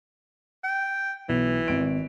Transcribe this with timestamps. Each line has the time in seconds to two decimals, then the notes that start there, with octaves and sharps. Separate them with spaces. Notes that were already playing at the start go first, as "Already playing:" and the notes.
0.64 G5
1.29 B1 E3
1.68 G#1 D7